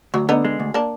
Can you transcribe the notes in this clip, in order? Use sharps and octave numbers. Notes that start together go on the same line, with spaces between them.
D2 F#3
D3 B3 D#4
G#3
D2
A#3 D4